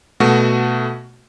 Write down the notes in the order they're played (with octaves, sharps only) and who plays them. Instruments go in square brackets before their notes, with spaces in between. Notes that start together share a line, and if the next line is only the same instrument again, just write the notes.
[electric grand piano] B2 A3 F#4